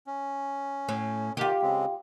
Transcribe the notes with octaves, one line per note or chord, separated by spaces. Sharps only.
C#4
A2
D#3 F4 G4
C#3 G#3 C4